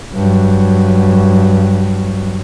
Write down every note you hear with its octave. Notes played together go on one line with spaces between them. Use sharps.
G2 F#3